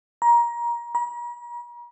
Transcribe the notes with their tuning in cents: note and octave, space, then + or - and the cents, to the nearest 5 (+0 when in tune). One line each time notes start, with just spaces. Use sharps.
A#5 +25
A#5 +45